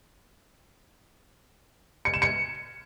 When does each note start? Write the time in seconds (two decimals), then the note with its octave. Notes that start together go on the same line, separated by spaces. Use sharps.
2.05 C#7
2.14 E7
2.22 C#7